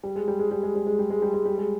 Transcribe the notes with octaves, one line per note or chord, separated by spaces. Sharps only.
G3
G#3
G3
G#3
G3
G#3
G3
G#3
G3
G#3
G3
G#3
G3
G#3